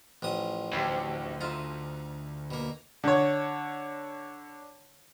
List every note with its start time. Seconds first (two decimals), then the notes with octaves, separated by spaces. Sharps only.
0.22 A1 F3 D#6
0.73 D2 E4 G4 C5
1.41 D#4 F4 D#5 E5
2.51 B2 A#3
3.04 D3 C#5